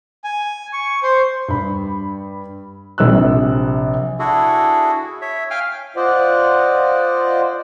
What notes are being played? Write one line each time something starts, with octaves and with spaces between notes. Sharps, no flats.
G#5
C#6
C5
G2 B5
A#1 C3 E6 F#6
D4 E4 F#4 G#4 A4
C#5 E5
F5 G5 G#5 F6
F4 C5 D5 D#5 F#5